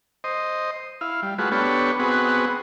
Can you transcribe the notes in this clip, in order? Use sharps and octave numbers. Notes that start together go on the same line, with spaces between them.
C5 D#5
E4 F5
G3
A3 F4 F#4 G#4 B4
B3 D4 G4 A4 B4 C#5
B3 C4 F#4 G#4 B4